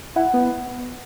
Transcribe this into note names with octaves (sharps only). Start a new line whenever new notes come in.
E4 F#5
B3